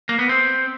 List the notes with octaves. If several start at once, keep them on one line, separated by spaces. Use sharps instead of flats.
A#3
B3
C4